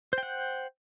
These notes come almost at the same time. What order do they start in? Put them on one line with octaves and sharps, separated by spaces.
C5 G5 F#5